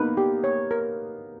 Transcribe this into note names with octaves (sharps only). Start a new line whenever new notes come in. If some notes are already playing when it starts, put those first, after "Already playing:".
Already playing: A#3 B3 D#4 B4
G4
C#5
A#4